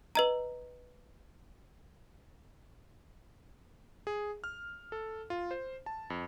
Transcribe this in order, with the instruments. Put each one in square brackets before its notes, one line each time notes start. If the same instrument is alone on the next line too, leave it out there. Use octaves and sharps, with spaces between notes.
[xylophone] B4 D#5 A#5
[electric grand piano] G#4
F6
A4
F4
C5
A5
F2